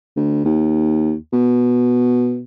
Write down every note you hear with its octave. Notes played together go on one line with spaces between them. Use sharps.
D2
D#2
B2